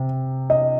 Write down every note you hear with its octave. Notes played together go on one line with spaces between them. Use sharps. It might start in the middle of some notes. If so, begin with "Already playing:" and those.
Already playing: C3
D#5